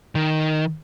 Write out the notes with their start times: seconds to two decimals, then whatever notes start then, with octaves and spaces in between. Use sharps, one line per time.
0.15 D#3